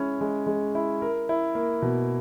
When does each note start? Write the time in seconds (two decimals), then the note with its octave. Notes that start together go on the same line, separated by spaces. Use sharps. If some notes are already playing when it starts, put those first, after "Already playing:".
Already playing: G#3 C#4 E4
0.21 G#3
0.47 G#3
0.75 E4
1.02 A#4
1.29 E4
1.55 A#3
1.82 B2